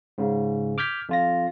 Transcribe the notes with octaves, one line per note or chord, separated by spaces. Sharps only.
G#2 C#3
D6 F6 G6 G#6 B6
F2 F4 A#6